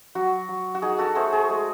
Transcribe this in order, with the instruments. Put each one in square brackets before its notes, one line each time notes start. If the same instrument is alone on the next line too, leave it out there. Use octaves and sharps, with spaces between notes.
[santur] F#3 F#4
F#3
F#4
D#4 G#4
F#4 A4
A3 G#4 C5
G#4
G#3